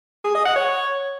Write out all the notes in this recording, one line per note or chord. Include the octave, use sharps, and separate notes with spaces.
G#4
D#5
F#5
C#5